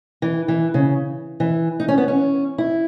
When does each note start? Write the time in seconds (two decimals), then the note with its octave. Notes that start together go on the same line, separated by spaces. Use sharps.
0.22 E3
0.48 E3
0.74 C#3
1.40 E3
1.80 D#4
1.88 C#4
1.98 B3
2.08 C#4
2.58 E4